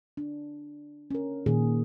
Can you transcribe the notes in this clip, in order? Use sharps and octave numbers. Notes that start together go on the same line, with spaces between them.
D4
C#4 A#4
A#2 D#3 G#4